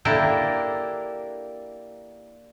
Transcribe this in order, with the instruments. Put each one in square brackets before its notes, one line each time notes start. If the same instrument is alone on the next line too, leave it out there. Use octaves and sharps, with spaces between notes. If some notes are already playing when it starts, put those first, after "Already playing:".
[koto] A#3 D4 E4 G4 A4 A#4